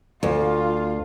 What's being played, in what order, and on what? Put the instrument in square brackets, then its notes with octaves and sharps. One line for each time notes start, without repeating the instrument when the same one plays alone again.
[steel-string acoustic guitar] D2 [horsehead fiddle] F4 F5